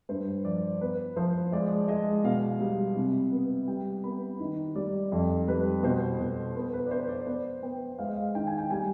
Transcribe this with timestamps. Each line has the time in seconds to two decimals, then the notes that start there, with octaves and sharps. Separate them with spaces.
0.09 G2 C5
0.44 F3 D5
0.81 B3 B4
1.16 F3 C5
1.52 G#3 D5
1.88 G#3 D#5
2.24 B2 F5
2.60 G3
2.96 C3
3.32 B3
3.68 G3 G5
4.04 B3 B5
4.40 D#3
4.75 G3 D5
5.12 F2
5.47 G3 B4
5.83 B2 C5
6.19 B2
6.55 B3
6.73 B4
6.87 D5
6.91 B3 C5
7.09 D5
7.27 B3 C5
7.62 B3 G5
7.99 G#3 F5
8.07 D#5
8.15 F5
8.35 D#3 G5
8.47 G#5
8.58 G5
8.70 G3 G#5